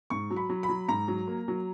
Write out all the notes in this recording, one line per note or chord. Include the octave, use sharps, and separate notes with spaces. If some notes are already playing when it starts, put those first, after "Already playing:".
G#2 C#6
F#3
B5
F#3
B5
F#3
G#2 A#5
F#3
A#3
F#3